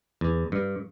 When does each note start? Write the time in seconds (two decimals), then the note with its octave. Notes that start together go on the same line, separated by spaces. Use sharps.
0.21 E2
0.52 G2